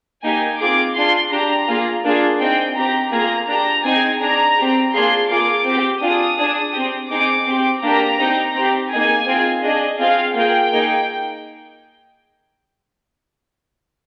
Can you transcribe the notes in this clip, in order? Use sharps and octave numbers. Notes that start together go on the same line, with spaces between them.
A#3 D#4 G4 G#5
C4 F4 G#4 D6
D4 F4 G#4 C6
D4 G4 A#5
A#3 F4 G#4
A#3 D4 F4 G#4
C4 D#4 G#4 G5
C4 G4 A#5
A#3 F4 G#4 A#5
D4 G4 A#5
C4 D#4 G#4 G#5
D4 G#4 A#5
C4 G4
A#3 D4 F4 G#4 C6
A#3 F4 G#4 D6
C4 G4
D4 F4 G#4 D#6
D4 G#4
C4 G4
C4 D#4 G#4 D6
C4 G4
A#3 D4 G4 A#5
C4 D#4 G4
C4 G4
A#3 D#4 G#4 G#5
C4 F4 G#4
D4 G#4 D#5
C4 F4 G#4 F5
A#3 F4 G#4 G5
A#3 D#4 G#4